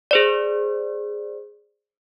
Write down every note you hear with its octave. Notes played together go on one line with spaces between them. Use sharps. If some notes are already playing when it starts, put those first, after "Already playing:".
G#4 C5 D5